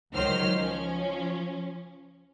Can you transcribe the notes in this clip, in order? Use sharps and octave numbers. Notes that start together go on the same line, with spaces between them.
C#2 D#3 F#3 C5 C#5 F6
F3 C#4